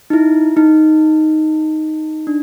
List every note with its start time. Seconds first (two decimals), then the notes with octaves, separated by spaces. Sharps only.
0.10 D#4
0.13 E4
0.57 D#4
2.27 D4